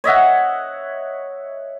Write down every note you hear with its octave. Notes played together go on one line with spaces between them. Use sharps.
C#5 D#5 E5 F#5